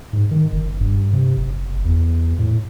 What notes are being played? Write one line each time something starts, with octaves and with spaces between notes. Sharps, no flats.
G#2
D#3
F#1
G2
C3
F#1
E2
A2